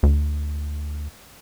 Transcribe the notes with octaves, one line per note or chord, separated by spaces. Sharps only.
D2